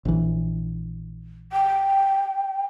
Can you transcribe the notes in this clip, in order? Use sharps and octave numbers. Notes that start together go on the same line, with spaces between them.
A#1 E3
G5